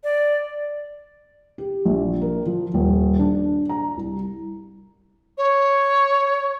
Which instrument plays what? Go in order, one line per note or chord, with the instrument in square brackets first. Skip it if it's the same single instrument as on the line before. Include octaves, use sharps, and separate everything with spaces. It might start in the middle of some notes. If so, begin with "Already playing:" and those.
[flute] D5
[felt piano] G4
A#1
A#4
F3
D#1
D4
A#5
C2
[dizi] C#5